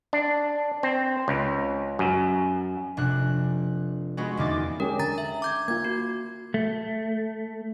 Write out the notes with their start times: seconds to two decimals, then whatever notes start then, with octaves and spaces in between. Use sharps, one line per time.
0.13 D4
0.83 C4
1.28 C#2
1.99 F#2
2.97 F1 D4 F#6
4.17 G#3 B3 C#4 F#4
4.37 E2 D3 A#3 D#4 D6 A6
4.80 G#3 C#4 G4 A#4
4.99 D3 A#5 A6
5.18 E5
5.42 D6 G6 G#6
5.68 A#3 F4 G#6
5.85 F#4
6.54 A3